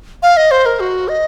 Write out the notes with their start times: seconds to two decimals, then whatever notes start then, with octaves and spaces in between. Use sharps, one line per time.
0.23 F5
0.37 D#5
0.51 C5
0.66 A#4
0.80 F#4
1.08 D#5